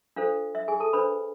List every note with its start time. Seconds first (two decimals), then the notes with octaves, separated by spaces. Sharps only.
0.16 D4 F4 A4 C5 F5
0.55 E5
0.68 G#4 G#5
0.80 A4 A5
0.93 D4 A4 B4 C5 B5